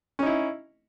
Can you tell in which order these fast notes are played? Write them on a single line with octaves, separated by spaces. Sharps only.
C#4 D#4 E4